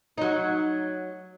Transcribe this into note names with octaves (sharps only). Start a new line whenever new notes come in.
F#3 D#4